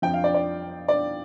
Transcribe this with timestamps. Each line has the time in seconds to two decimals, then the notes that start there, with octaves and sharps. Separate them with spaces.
0.02 F2 F3 G5
0.14 F5
0.24 D5
0.34 D5
0.88 D5